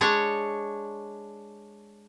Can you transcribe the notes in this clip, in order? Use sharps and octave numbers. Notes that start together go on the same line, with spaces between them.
G#3 D4 C#5